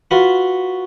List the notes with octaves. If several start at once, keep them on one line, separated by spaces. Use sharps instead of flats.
F4 F#4 B4 B5